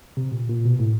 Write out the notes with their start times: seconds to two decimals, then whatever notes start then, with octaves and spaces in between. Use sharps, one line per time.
0.17 C3
0.32 A#2
0.49 A#2
0.65 B2
0.79 A2